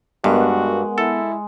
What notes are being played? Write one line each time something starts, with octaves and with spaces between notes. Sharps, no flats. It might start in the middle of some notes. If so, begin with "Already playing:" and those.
G2 G#3 B3 F#4 A#4 F#5
E4 A4